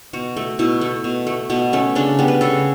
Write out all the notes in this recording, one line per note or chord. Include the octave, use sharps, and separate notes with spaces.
B2 F#4
A3
B2 E4
A3
B2
A3
B2 B3
A3 C#4
C#3 D4
G3 B3
B4
C#3 A4